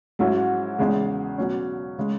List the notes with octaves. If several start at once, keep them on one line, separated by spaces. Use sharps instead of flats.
G#2 F#3 C#4 E4
E2 C#3 G#3
B2 F#3 C#4
C#3 G#3